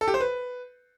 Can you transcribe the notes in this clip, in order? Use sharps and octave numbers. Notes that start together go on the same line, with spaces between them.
A4
G4
C5
B4